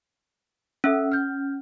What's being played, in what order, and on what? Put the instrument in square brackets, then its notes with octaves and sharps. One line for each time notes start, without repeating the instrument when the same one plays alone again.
[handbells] C#4 [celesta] A4 E5 E6
[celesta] F6 G6